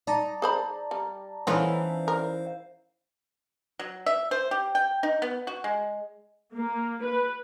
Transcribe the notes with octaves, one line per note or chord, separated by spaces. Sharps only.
D#4 D5 A5 A#5
G#4 C5 B5
G3
E3 A3 B3 C#4 D#4 F4 C5 F5
A#4
F#3
E5
C5
G4
G5
D#4
B3
F#4
G#3
A#3
B4